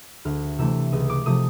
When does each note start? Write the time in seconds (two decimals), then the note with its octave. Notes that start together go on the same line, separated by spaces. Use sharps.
0.25 D2 F6
0.58 C3 E3 A3 C4 E6
0.92 C#2 D#6
1.10 D6
1.26 C3 F3 A3 D#6